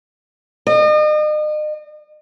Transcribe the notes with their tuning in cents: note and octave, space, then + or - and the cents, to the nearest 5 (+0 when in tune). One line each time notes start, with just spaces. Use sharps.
D#5 -40